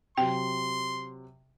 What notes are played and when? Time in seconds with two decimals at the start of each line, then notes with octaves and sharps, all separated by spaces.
0.18 C3 F#3 G5 C6